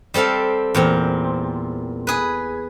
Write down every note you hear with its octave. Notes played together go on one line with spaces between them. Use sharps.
G3 C4 A4 F5
E2 A#2 C4
G#4 B4